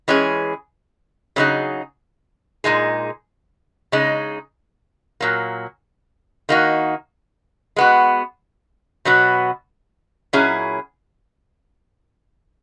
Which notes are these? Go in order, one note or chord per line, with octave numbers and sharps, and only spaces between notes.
E3 G#3 C#4 G#4
C#3 F#3 A#3 D#4 G#4
A#2 G#3 D#4 G#4
C#3 G#3 D#4
A#2 F#3 A#3
D#3 A#3 D#4 F#4
G#3 B3 F#4
B2 F#3 B3 F#4
A#2 F#3 C#4 E4 G#4